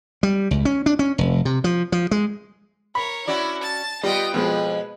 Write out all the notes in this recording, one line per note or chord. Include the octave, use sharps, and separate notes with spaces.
G3
C#2
C#4
D4
C#4
F1
C3
F3
F3
G#3
A#4 C#5 B5
C#4 E4 F#4 D5
A5 A6
G3 B3 F4 D#5 G5
F2 B2 F3 G#3 B4